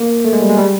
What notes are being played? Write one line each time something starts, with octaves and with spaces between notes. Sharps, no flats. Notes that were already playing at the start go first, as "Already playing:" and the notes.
Already playing: A#3
A3
G#3
G3
G#3
G3